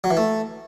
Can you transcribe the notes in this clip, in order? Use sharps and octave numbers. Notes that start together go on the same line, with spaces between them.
F#3
E3
A3